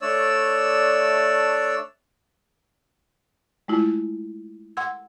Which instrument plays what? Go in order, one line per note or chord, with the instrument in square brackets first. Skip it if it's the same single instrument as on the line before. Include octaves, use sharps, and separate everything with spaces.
[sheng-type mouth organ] A3 D4 C#5 D5 E6
[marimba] G#3 A3 E4 F4
F#5 C6 E6 G#6